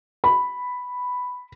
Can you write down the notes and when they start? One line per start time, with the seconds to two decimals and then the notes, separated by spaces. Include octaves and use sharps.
0.24 B5